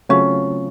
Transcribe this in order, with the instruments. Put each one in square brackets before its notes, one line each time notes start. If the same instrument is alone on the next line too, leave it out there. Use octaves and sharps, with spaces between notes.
[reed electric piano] C#3 F#3 A3 C4 F4 [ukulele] C#4